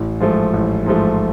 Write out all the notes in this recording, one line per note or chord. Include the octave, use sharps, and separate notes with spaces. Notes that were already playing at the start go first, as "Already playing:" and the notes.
Already playing: A1
G#2 F3 A3
A1
G#2 F3 A3